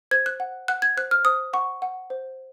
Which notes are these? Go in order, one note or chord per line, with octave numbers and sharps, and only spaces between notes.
C5 G#6
F#6
F#5
F#5 F#6
G#6
C5 F#6
F6
C5 D#6
F#5 C#6
F#5
C5